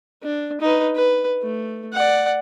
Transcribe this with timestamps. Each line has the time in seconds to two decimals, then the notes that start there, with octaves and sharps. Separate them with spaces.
0.23 D4
0.61 D#4 B4
0.95 B4
1.42 A3
1.93 D5 F#5